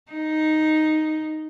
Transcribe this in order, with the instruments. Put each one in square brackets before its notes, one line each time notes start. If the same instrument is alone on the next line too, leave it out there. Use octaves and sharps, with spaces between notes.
[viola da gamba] D#4